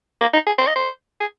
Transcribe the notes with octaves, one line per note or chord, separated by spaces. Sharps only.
A#3
D#4
G#4
C5
D#5
C5
G#4